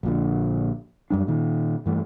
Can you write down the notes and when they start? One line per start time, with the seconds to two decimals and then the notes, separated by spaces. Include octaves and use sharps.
0.03 A#1 A#2 D3
1.10 F#2 G3 D4
1.27 A#2 D#3
1.86 G2 E3 A3